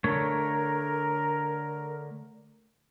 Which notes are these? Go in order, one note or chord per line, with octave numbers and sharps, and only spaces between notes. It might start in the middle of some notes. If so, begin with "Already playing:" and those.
D3 A3 A#4 C#5